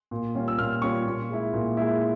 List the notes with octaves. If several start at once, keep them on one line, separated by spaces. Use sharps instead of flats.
A#2
G3 C#4 F4
E6
A#2 F6
G3 C#4 F4 C#6
A#2
G#3 E4
A#2
G#3 E4